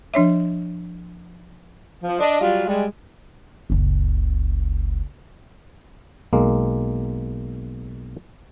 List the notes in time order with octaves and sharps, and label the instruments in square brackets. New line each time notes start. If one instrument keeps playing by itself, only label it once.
[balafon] F3 D4 C#5 E5
[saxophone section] F3
D4 D#5
F#3 G3 F4
G3 G#3
[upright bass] F#1 C#2
[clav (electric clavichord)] B1 G#3 A#3